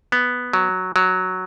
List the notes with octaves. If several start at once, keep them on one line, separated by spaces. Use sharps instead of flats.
B3
F#3
F#3